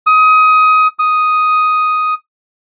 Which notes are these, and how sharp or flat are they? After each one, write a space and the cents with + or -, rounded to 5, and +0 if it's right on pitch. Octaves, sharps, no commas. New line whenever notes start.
D#6 +20
D#6 +5